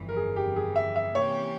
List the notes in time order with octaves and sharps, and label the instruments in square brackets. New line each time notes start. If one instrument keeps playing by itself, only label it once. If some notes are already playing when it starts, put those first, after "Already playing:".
Already playing: [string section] G1 F2 E3
[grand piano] A#4
G#4
G4
G#4
E5
E5
[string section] C3 E3 A#3 C#4 G4 [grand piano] C#5